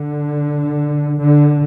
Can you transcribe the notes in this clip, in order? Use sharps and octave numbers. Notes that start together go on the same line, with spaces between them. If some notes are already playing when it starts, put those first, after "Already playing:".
Already playing: D3
D3